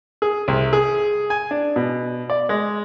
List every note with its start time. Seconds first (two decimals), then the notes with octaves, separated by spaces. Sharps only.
0.22 G#4
0.48 C2
0.73 G#4
1.30 G#5
1.51 D4
1.76 B2
2.30 D5
2.49 G#3